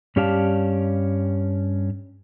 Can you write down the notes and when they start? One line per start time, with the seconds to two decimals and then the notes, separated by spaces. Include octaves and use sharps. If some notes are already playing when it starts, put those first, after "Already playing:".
0.16 G2 C#4 G4 D5 F5 A5